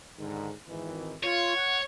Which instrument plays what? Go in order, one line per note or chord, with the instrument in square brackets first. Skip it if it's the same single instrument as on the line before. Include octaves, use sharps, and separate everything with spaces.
[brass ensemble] G#2 D3 D#3
G#1 D#3 E3
[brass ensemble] F4 [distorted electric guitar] C#5
[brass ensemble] F#5